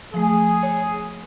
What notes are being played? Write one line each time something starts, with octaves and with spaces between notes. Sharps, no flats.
F3 A3 G#4
C#5